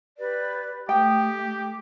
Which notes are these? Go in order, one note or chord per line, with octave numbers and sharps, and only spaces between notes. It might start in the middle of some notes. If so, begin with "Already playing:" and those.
G4 B4 D5
A3 G4 G5 D#6
D6